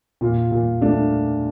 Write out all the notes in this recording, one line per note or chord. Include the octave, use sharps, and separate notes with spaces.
A#2 F4
A#2
A3 D4